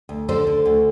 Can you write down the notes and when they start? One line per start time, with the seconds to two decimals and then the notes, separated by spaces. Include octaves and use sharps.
0.09 D2
0.29 D3 A4 C5
0.47 D3
0.65 D2